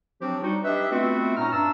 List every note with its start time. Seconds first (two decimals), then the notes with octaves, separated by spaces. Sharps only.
0.21 F3 F#3 C4 D4 G4
0.43 G3 D#4 F#4
0.65 D4 G4 B4 D#5 E5
0.92 A3 B3 C4 F4 F#4 E5
1.37 A#2 C#4 D#4 A#5 F6
1.52 G2 D4 A5 A#5 E6